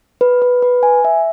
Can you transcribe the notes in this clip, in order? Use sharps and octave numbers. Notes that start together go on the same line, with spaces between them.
B4
B4
B4
G#5
E5